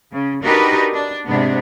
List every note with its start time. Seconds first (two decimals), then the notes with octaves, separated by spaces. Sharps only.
0.12 C#3
0.43 D4 D#4 F#4 G4 A#4 B4
0.93 D4
1.27 G#2 C3 B3 D4